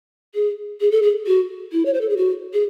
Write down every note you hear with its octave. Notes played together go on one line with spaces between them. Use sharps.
G#4
G#4
A4
G#4
F#4
E4
C#5
C5
A4
G#4
F#4
G#4